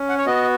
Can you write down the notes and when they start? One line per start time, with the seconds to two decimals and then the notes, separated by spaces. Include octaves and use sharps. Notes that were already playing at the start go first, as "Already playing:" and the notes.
Already playing: C#4
0.09 F#5
0.18 C#5
0.26 B3 F#4 D#5